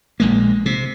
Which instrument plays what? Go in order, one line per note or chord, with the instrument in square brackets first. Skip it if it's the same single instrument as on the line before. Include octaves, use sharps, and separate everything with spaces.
[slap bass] A#1 G#3 A#3
C3